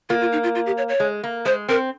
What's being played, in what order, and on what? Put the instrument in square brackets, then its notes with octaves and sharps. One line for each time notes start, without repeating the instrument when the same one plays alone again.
[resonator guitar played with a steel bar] A#3 [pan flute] F4
[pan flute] F4
D#4
F4
F4
G4
C#5
C#5
[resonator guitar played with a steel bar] G#3
A#3
[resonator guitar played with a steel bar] G#3 [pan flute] C5
[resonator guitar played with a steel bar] C4 [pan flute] A#4